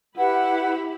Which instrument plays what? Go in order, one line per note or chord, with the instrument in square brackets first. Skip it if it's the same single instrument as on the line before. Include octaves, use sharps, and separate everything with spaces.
[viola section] E4 G4 B5 [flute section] B4 F#5